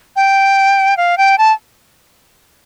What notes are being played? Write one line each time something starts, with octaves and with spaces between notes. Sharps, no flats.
G5
F5
G5
A5